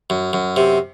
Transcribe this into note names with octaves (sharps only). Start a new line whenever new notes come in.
F#2
F#2
C3